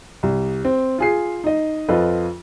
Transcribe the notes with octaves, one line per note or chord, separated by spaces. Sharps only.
C2
C4
F4 G#4 C7
D#4 D#5
F2 F4 A4 B4 D#5